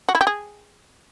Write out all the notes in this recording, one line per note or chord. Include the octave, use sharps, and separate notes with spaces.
F#4
E4
G4
G#4